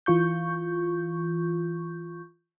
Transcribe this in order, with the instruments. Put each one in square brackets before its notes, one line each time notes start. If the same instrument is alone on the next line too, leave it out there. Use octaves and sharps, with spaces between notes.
[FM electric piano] E3 F4 C#6 G6